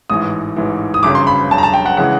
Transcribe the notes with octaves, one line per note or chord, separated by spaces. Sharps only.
A1 G#2 E3 D#6
A1 G#2 E3
D#6
G1 F#2 C#3 F#3 D6
C6
B5
G1 F#2 C#3 F#3 A5
A#5
A5
G5
F#5
C#3 E3 G#3 F#5